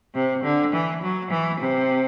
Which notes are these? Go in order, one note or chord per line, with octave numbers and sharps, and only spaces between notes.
C3
D3
E3
F#3
E3
C3